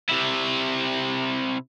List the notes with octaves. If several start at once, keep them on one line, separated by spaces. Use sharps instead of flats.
C3 E4